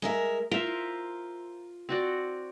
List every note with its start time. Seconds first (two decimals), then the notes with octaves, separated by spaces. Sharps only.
0.02 G#3 A#4 E5
0.51 F4 A#4 C5 E5
1.89 C4 F#4 D5